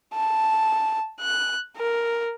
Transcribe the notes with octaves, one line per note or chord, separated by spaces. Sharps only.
A5
F#6
A#4